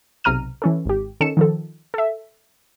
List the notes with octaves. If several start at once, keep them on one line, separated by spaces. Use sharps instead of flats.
B1 C3 A#5 F6 D#7
E3 C#4 A4
G#1 G4
D#3 C#4 A4 C#7 E7
D#3 F3 A4
A4 E5